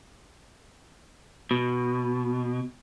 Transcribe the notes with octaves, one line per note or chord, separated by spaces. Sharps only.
B2